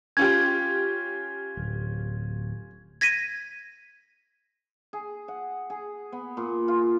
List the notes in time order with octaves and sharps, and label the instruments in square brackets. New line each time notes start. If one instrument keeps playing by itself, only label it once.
[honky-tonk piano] C#4 F4 G4 [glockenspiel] G#6
[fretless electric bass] D1
[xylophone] G#6 A#6 B6 D#7
[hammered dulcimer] G#4
F#5
G#4
B3
A#2
F4